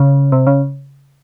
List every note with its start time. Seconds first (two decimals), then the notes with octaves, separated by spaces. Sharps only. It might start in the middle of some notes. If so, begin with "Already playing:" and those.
Already playing: C#3
0.32 C3
0.47 C#3